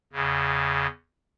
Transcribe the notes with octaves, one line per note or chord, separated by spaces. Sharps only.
E2 C#3